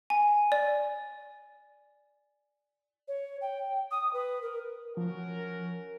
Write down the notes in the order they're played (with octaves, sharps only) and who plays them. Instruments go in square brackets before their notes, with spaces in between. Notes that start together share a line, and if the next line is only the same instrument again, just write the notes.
[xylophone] G#5
D5
[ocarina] C#5
G5
D#6
B4
A#4
[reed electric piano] F3 [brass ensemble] C#4 F#4 A#4